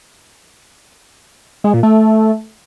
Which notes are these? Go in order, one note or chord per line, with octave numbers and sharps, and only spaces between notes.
G#3
A#2
A3